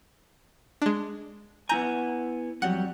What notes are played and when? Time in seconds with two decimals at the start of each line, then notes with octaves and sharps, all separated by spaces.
0.82 G#3 D4
1.69 B3 E4 G#5 A#5 G6
2.62 F2 F#3 G3 F#5